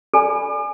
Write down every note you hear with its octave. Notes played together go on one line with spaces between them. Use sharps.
A4 D5 G#5 B5